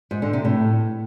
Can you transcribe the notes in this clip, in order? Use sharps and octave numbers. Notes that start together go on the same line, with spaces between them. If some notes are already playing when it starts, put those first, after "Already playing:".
G#2
D3
C3
A2